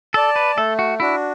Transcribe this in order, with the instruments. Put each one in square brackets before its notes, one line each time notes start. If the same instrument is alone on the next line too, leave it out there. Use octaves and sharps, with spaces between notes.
[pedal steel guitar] A4 [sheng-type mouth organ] D5 A5
[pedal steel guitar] B4
[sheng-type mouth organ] A3 [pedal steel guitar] A4
[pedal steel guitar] F#4
[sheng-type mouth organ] D4 F#4 [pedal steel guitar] E4